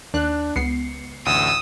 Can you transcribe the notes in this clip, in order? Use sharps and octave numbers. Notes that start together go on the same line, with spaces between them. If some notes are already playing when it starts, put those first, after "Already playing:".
D#2 D4 F#6
C#2 B3 C7 C#7
A1 D2 D#6 E6